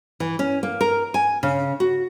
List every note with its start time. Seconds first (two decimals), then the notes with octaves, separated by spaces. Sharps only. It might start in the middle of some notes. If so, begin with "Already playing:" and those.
0.20 E3
0.39 C#4
0.63 A#3
0.81 A#4
1.14 G#5
1.43 C#3
1.80 F#4